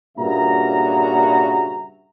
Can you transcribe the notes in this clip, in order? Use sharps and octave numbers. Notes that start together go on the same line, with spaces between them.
G2 A#2 C#3 F#4 E5 A#5